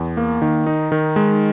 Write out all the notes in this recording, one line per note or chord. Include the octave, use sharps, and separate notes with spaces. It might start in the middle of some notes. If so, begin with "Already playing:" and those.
Already playing: E2
A#3
D#3
D#4
D#3
G#3